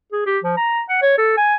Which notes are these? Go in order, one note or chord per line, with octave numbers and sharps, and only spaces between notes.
G#4
G4
F3
A#5
F#5
C#5
A4
G#5